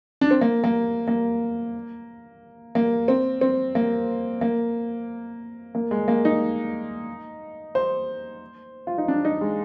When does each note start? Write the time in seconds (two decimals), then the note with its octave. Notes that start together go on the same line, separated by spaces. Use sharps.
0.21 D4
0.31 C4
0.41 A#3
0.64 A#3
1.08 A#3
2.75 A#3
3.08 C4
3.41 C4
3.75 A#3
4.41 A#3
5.75 A#3
5.91 G#3
6.08 A#3
6.25 D#4
7.75 C5
8.87 F4
8.98 D#4
9.08 D4
9.25 D#4
9.41 G#3